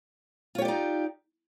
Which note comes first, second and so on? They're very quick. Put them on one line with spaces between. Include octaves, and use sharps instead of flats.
F4 C#5 G4 D5 D#4